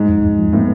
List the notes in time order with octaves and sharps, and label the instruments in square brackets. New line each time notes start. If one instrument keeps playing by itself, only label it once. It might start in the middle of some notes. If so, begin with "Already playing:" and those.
Already playing: [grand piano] G#2
[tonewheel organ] F2
F2
F3
[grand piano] A2 [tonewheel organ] B3